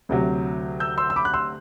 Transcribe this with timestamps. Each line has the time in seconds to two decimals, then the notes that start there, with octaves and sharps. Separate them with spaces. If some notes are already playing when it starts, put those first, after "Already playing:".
0.09 D2 C3 F#3
0.80 E6 G6
0.98 C6 E6
1.10 E6
1.16 B5 D6
1.25 F#6
1.34 C6 E6